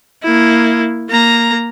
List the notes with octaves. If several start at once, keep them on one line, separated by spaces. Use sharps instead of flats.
A#3 E4
A#3 A#5